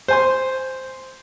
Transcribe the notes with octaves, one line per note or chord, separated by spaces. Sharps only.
C5 G#5 C6